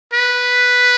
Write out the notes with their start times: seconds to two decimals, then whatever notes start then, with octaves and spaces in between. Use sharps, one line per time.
0.13 B4